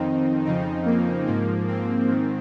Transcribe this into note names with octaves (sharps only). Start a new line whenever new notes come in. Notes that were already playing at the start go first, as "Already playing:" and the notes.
Already playing: F2 D#3 C4 D#4
F2 C#3 F3 C4 D#4
A#3
G#2 F3 A#3
C4
G#2 D#3